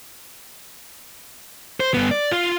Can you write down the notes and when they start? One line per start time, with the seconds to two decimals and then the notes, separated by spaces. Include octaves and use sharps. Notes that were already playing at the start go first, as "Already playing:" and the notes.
1.80 C5
1.94 G2 B3
2.11 D5
2.31 F4